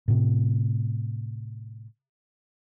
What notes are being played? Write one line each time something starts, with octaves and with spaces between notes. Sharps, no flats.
A2 C3